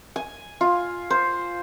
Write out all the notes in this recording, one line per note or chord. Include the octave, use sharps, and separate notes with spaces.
G#5
F4
C5